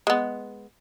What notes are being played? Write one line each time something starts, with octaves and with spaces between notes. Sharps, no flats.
G#3 B3